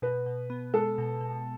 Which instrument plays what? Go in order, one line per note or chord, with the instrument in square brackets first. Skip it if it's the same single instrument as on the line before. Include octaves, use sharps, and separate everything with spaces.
[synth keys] B2 [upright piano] B4
[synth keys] B2
B3
[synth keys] G#3 [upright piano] A4
[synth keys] B2
B2